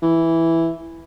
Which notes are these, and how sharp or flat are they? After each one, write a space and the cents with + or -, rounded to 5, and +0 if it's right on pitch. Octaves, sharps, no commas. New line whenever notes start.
E3 +0